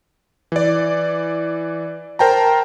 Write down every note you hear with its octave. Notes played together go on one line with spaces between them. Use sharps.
E3 D5
A#4 C5 G5 A5 A#5